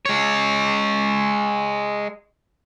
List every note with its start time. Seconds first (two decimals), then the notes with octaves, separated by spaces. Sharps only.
0.06 G#3 C#5